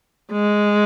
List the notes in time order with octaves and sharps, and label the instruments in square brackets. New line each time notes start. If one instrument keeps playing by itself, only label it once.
[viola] G#3